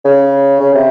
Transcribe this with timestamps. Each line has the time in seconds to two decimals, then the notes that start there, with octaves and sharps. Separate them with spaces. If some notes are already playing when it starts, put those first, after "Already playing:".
0.05 C#3
0.60 C#3
0.74 C3